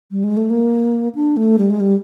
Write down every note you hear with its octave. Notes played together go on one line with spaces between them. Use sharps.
G3
G#3
A3
A#3
D4
A3
G3
G#3
G3